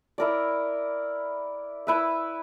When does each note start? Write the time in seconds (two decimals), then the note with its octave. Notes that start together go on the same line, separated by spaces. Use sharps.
0.18 E4 A#4 D5
1.87 E4 B4 E5